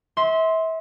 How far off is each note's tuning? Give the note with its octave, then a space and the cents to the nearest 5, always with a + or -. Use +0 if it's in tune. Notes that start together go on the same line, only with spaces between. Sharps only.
E5 -30 C6 +0